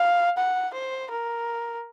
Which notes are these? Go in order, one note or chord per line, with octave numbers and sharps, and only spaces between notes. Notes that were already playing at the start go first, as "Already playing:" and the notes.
Already playing: F5
F#5
C5
A#4